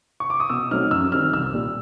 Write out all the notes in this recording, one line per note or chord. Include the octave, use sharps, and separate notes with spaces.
C#6
D6
D#6
B2 E6
F#3 A3 C4 D#4 F6
F#2 E6
D#3 G3 C4 D#4 F6
C2 E6
A#2 G3